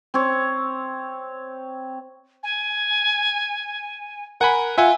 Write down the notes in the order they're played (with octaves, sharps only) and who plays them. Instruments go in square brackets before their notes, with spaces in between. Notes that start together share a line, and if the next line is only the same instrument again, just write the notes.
[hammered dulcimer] C4 C#5
[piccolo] G#5
[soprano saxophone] A#4 [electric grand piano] F#5 G#5 B5
[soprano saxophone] F4 [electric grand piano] E5 F#5 G#5